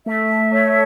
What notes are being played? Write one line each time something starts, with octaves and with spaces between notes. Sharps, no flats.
A3 E5
A3 C#5